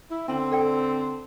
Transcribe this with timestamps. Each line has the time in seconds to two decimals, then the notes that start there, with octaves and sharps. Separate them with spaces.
0.11 E4
0.28 D3 C4 C#4 C6
0.52 A4 D5 G5